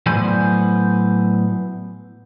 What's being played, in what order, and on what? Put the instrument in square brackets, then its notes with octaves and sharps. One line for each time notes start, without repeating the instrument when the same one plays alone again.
[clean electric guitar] A2 F#3 B3 C5 D5 G#5